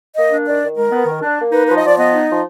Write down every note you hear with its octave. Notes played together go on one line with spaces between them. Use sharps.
A#3 D#5
D4
D#3 D5
D#3
G#3 A#4
B3
D#3
D4
A#3
D#4 B4
F3 B4
D#5
F3 D5
B3 D#5
D#4
F3